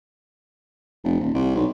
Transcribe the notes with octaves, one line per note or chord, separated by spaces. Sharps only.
F1
D#1
C2
B1